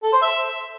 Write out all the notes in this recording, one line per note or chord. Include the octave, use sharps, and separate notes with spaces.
A4
C5
E5